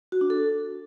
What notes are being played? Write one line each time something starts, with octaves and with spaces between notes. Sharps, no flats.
F#4
D4
A4